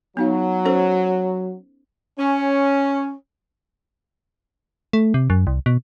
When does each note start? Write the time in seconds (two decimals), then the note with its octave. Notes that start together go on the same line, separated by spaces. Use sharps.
0.17 F#3 B3 D#4 F5
0.65 C#4 A4 C5
2.19 C#4
4.93 A3
5.14 C3
5.30 F#2
5.47 C2
5.66 B2